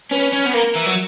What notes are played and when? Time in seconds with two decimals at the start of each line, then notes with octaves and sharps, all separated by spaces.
0.11 C#4 B4
0.33 C#4
0.46 B3
0.54 A#3 A#4
0.76 E3
0.87 F#3